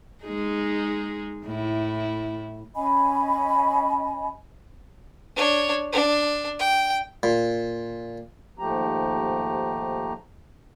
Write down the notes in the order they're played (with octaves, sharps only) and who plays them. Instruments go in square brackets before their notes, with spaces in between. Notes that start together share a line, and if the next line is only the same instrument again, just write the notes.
[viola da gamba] G#3 D#4 G#4
A2 E4
[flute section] C#4 D#5 G#5 B5
[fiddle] D4 C#5
D4
G5
[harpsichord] A#2
[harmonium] D#2 G#2 F3 A3 G4 A#5